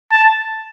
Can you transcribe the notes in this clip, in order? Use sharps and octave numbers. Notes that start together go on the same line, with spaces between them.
A5